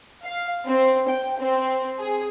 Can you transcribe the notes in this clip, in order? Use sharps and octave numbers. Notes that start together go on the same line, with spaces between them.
F5
C4
G5
C4
G#4